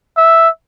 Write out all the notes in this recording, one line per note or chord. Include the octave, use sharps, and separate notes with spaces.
E5